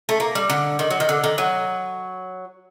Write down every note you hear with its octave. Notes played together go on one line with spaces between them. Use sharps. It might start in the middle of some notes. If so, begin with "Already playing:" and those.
A3
A#3
G3
D3
D#3
F#3
D#3
D3
D#3
F#3